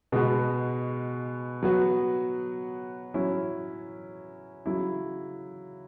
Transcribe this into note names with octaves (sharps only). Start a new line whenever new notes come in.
B2 G#3 B3 F#4
F#3 B3 F#4
F#3 C#4 E4
C#3 F#3 E4